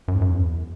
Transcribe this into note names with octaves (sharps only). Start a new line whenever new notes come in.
F#2
G#2
F#2
E2